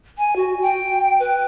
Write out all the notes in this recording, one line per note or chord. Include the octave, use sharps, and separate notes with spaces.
G#5
F#4
G5
B4